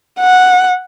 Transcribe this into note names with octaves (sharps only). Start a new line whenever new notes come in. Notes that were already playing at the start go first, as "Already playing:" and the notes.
F#5